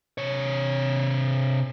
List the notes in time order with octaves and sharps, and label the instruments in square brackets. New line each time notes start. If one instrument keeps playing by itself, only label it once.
[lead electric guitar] C3 C#5